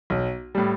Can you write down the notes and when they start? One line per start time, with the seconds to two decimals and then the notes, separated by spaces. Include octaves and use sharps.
0.10 B1
0.55 A2 G3